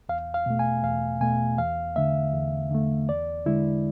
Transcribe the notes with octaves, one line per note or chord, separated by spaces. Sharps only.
E2 F5
F5
B2 A3
G#5
E2 F5
B2 A3 G#5
E2 F5
D3 A3 E5
E2
D3 A3
E2 D5
D3 G#3 E4